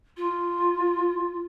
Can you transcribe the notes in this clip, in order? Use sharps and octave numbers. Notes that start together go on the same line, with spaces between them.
F4